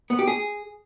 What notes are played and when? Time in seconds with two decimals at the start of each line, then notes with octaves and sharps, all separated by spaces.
0.10 B3
0.19 G4
0.27 G#4